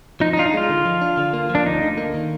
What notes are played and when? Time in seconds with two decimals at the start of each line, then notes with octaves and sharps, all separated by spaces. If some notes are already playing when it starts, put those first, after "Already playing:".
0.20 F3 D#4
0.33 D#4
0.37 D4 F4
0.46 D#4
0.54 G#3 F4
0.70 D3
0.86 F3
1.01 D4
1.17 D3
1.33 A#3
1.49 F3
1.55 D4
1.66 D2 D#4
1.82 D3
1.98 A#3
2.14 D#3